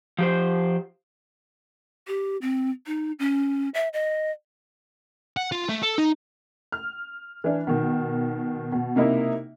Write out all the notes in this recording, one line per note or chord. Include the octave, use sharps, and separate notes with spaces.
F3 G4 C5
G4
C4
D#4
C#4
E5
D#5
F#5
F4
A3
A4
D#4
F6
E3 D4
B2 D#3
B2
C3 A#3 D#4 E4